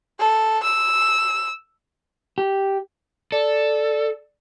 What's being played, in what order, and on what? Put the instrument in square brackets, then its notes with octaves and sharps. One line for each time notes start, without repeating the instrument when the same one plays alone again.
[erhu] A4
E6
[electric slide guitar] G4
[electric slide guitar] A4 [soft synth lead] D5